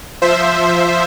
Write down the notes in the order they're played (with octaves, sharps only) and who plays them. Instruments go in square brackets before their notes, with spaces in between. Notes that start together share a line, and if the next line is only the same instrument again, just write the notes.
[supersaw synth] F3 C5 E5